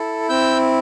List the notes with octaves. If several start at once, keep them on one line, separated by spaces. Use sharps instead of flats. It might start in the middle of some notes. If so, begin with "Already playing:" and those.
Already playing: E4 A4
C4 E6 G6